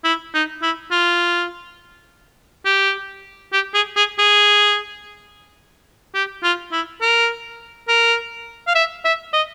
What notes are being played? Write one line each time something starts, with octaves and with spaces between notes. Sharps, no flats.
E4
D#4
E4
F4
G4
G4
G#4
G#4
G#4
G4
F4
E4
A#4
A#4
F5
E5
E5
D#5